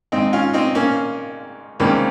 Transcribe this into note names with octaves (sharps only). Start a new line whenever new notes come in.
G#1 G#2 D#3 G#3 C4 D#4
C#4 F4
C4 D#4
A#3 C#4
C#2 C3 D#3 G3 A#3 C4 C#4